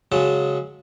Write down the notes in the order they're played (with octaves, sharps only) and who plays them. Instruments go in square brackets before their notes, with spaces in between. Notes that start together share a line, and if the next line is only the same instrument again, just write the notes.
[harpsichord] C#3 F#3 G#3 A5